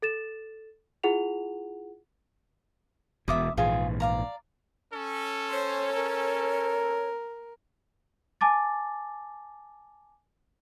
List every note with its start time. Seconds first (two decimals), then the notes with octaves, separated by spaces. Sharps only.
0.02 A4 A6 E7
1.04 E4 F4 G#4 F#5 F7
3.28 E1 B2 E5 D6 D#6
3.57 A#1 G#2 E3 F4 G#4
4.00 D5 F5 A#5
4.93 C#4 A4
5.51 C5 C#5
5.92 A#4
8.41 G#5 A5 D6 A6